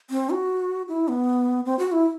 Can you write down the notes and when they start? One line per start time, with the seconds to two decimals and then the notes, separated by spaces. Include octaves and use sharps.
0.10 C4
0.30 F#4
0.88 E4
1.08 B3
1.66 C4
1.79 F#4
1.92 E4